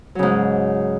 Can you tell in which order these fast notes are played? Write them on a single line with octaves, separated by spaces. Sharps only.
F#3 C#3 G#2